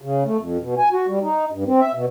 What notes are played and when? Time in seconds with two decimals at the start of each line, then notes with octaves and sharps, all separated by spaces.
0.02 C#3
0.25 A3
0.38 F2
0.61 B2
0.78 G#5
0.92 F#4
1.08 G3
1.22 D#4
1.52 G2
1.66 C4
1.80 E5
1.95 B2